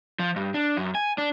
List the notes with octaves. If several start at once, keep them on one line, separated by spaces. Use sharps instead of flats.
F3
G2
D4
F#2
G#5
D4